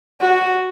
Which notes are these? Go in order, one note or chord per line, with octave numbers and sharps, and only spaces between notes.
F#4